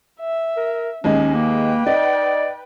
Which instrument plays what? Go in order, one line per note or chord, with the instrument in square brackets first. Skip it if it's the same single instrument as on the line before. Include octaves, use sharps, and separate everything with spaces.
[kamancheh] E5
[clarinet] A#4
[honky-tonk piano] D#2 G#3 D#4 [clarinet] C#4
[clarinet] A#3 [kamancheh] B4 G5
[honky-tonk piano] D#4 [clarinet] D5